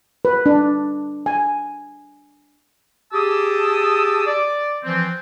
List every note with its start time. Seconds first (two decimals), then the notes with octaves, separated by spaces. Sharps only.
0.25 B4
0.46 D4
1.26 G#5
3.12 G4 G#4 A5 D#6 E6
4.26 D5
4.84 E3 F3 C4